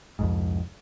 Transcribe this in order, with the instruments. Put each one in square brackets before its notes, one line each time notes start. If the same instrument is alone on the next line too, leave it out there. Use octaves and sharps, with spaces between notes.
[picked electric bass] C2 F2 G#2